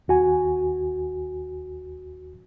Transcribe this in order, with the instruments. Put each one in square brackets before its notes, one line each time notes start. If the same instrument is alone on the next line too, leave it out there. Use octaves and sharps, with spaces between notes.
[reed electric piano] D#2 F#4 G#5